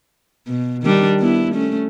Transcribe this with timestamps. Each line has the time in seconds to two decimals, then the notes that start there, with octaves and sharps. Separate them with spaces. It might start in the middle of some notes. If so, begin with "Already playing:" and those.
0.47 B2
0.83 D#3 G3 D4
1.19 B3 E4
1.54 A3 C#4